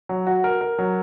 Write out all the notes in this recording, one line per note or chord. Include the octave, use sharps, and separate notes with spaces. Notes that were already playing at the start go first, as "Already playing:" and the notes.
F#3
F#4
A#4
A#4
F#3